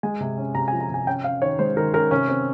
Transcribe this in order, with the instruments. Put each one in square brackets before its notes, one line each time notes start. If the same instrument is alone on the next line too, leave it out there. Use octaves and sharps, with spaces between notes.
[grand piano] G#3 G#5
C3
C#4
C3 A#5
G#5
F3
A#5
C3 G#5
C#4 G5
C#4 F5
D#3 C#5
G#3 C5
D#3 A#4
C#4 A#4
C3 C#4
C4